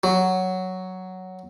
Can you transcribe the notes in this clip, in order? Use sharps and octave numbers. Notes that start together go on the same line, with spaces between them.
F#3